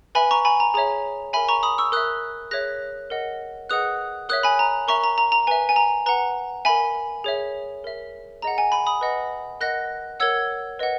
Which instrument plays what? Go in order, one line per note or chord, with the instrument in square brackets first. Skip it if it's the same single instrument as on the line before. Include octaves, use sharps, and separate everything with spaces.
[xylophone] B4 E5 G#5 B5
A#5 C#6
G#5 B5
A#5
G#4 C#5 E5 A#5
A#4 E5 G#5 B5
A#5 C#6
B5 D#6
C#6 E6
A#4 E5 D#6 F#6
G#4 C#5 E5 F#6 A#6
A#4 D#5 F#5
G#4 B4 D#5 F#5 D#6 F#6
A#4 C#5 E5 D#6 F#6
G#5 B5
A#5
A#4 E5 A#5 C#6
A#5
A#5
A#5
B4 E5 G#5
G#5
A#5
B4 F#5 A#5
A#4 E5 G#5 B5
G#4 C#5 E5
A#4 E5
G#4 D#5 F#5 A#5
G#5
G#5 B5
B5 D#6
B4 D#5 F#5
A#4 D#5 F#5 F#6 A#6
A#4 C#5 F#5 E6 G#6
B4 D#5 F#5